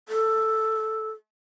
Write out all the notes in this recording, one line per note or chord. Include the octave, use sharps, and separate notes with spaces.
A4